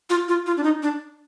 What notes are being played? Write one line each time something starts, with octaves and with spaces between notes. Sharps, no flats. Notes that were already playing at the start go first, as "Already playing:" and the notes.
F4
F4
F4
D4
D#4
D4